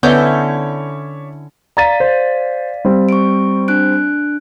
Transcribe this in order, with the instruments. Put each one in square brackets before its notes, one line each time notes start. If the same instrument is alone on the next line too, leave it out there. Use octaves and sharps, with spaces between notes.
[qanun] D3 C#4 E4 [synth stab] B3 G6 [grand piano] C#5 D5 E5
[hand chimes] D5 F5 B6 [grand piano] A#5 A6 D#7
[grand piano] C5
G3 C4
[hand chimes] C#6 D7
D4 F#6 D7